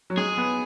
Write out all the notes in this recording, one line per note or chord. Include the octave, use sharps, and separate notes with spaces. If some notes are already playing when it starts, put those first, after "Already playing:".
F#3
G#3 G#4
B3